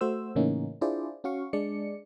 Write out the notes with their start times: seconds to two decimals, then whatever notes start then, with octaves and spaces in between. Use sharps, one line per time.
0.01 A3 F#4 C5 E6
0.35 A2 C#3 E3 A#3 C#4 D#4
0.81 D4 E4 F4 G#4 C5 D5
1.24 C#4 F#4 F5 C#6
1.53 G#3 D4 D5 C#7